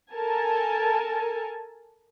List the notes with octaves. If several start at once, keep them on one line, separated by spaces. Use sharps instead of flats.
A4 A#4 G#5 A5